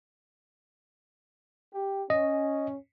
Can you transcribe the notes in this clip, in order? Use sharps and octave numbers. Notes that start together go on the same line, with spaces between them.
G4
C#4 D#5